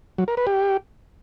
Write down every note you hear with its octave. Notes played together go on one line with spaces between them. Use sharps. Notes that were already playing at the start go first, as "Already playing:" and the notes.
F#3
A#4
B4
G4